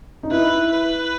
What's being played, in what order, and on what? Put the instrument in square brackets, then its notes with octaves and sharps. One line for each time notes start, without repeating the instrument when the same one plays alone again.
[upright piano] D#4
[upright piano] E4 [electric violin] B4
[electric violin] B4